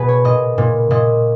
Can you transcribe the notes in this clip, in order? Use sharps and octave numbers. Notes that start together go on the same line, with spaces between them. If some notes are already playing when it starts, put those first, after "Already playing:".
Already playing: B2 G#4 B4
C#5
A#2 D#5
A#2
A#2 D#5